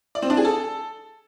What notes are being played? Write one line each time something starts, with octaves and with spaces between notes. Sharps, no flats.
D5
C4
D4
G#4
A4